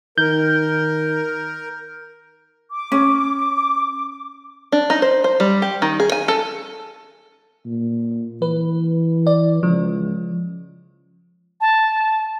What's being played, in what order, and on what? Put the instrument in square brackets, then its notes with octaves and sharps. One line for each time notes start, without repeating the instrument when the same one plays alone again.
[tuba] D#3 [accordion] A#4 [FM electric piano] G6
[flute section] D6
[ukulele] C#4
[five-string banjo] D4
D#4
C5
C5
G3
G4
D#3
G#4
G#5
A4
[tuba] A#2
[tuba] E3 [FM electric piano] B4
[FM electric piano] D5
[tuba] C#2 [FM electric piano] F3
[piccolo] A5